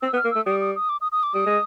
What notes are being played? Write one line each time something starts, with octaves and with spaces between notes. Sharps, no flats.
C4 E6
B3
F6
A#3
A3 E6
G3 D#6
D#6
D#6
D6
D#6
D#6
D6
G3 D#6
G#3